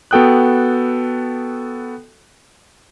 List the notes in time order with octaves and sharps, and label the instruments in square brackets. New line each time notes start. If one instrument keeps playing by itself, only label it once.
[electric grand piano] B3 F#4 A4 G5 D#6 F#6